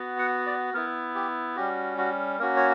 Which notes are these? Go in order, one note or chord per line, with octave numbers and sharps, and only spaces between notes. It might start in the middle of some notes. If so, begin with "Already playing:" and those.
Already playing: B3 F#4
F#5
D5
B3 E4 A#4
G4
G3 C#4 F#4 G4
F#4
A#3 C#4 F#4 A#4
C#5